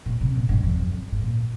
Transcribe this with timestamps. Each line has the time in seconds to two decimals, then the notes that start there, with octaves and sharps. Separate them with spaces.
0.06 A#2
0.21 C3
0.35 A#2
0.49 G2
0.63 F2
0.79 F2
1.12 G#2
1.22 A#2